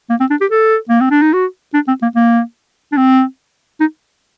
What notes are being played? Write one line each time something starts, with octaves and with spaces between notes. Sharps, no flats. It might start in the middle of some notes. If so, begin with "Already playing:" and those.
A#3
C4
D4
G4
A4
A#3
C4
D4
D#4
F#4
D4
C4
A#3
A#3
D4
C4
D#4